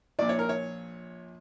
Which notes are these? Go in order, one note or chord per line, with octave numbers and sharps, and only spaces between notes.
A#1 A#2 D5
C#5
A#4
C#5